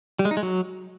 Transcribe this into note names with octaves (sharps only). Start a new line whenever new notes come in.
G3
G#3
D#4
G#3
F#3